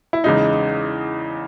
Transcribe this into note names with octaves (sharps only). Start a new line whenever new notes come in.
E4
E2 C#3 G#3 D#4